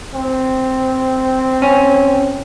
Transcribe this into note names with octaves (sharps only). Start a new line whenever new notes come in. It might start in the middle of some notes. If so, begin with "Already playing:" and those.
C4
C#4